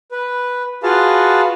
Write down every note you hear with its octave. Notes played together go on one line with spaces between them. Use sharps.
B4
F4 F#4 G#4 B4 F5 A5